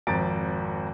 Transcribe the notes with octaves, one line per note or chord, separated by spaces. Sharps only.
G#1 F2 A#5 A6 D7